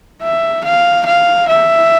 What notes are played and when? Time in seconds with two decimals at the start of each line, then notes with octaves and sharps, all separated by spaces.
0.22 E5
0.64 F5
1.06 F5
1.48 E5